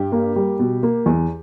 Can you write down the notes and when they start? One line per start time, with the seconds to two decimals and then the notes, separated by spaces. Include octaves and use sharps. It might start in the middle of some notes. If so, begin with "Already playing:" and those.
Already playing: G2 G4
0.12 A#3
0.36 G3
0.59 B2
0.83 A#3
1.06 E2